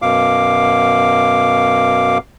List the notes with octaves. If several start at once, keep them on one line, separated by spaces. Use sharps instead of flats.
F#2 B2 F5 D6